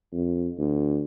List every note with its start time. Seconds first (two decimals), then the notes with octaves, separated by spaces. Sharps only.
0.12 F2
0.58 D2